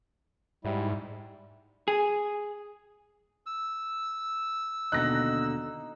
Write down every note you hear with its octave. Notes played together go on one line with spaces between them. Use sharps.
G#2 G3 E4
G#4
E6
D#2 B2 D3 D#4 F#6 A#6